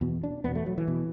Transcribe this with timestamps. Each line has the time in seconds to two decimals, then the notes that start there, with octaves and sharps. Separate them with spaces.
0.01 E2 B2
0.24 D4
0.44 E2 B2 B3
0.55 A3
0.66 F#3
0.78 E3
0.88 B2